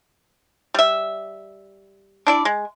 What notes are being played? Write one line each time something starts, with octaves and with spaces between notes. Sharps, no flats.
G3 E5
D4 E4 D5
G#3